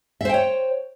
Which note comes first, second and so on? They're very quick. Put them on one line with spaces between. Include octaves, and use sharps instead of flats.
E5 C5 G5 C#5